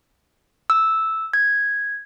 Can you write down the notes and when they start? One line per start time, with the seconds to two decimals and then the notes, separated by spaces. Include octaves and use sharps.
0.70 E6
1.34 G#6